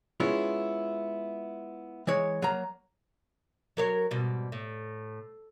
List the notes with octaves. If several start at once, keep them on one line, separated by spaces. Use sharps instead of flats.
G#3 B3 C#4 E4 F4
E3 G#3 C#5
F#3 A#3 A#5
F#3 A#4 C#5
G#2 B2 G3
A2